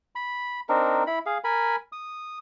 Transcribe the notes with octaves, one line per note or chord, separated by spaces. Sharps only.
B5
C4 D4 D#4 A#4
E4 B5
G#4 F5
A#4 G#5 B5
D#6